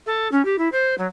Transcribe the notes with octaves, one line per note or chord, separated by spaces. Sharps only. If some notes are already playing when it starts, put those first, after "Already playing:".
A4
C#4
G4
E4
C5
F#3